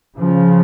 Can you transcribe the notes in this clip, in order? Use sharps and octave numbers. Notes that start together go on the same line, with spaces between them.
C#3 F3